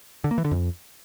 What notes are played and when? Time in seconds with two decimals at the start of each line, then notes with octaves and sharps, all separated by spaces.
0.24 D3
0.31 A#3
0.38 E3
0.44 D3
0.51 F2